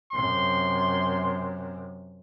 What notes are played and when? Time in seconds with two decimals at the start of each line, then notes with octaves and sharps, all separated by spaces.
0.12 F#2 C3 C6